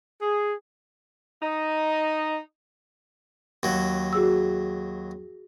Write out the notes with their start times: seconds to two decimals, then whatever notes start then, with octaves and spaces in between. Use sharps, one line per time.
0.22 G#4
1.42 D#4
3.63 D#2 F#3
4.13 F#4 G#4 E6